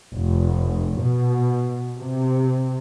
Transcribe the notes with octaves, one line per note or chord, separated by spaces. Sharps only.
F1
B2
C3